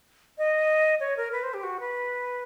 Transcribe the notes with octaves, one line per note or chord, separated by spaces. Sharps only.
D#5
C#5
A#4
B4
C5
G4
F#4
B4